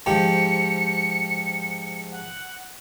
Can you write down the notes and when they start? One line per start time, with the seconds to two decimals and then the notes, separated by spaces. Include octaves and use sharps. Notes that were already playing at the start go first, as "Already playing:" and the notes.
0.06 G#2 F3 G4 C#7
2.12 F#5